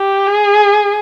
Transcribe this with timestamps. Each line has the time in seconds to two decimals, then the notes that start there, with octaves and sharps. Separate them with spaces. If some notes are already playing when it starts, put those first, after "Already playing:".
Already playing: G4
0.27 G#4